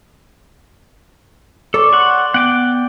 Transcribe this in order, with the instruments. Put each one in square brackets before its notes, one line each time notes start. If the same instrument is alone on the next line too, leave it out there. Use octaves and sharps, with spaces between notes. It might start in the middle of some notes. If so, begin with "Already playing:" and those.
[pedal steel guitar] A4 [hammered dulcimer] D5 [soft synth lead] C#6
[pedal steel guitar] F#5 C#6 [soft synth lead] C6
[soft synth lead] B3 [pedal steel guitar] F#5 G5 D6